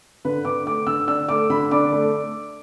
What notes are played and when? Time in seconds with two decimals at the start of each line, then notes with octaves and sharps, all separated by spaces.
0.25 D3 B4
0.45 D3 D6
0.66 A3 D6
0.87 D3 E6
1.08 D4 E6
1.29 A3 D6
1.50 D3 B5
1.71 D4 D6
1.93 A3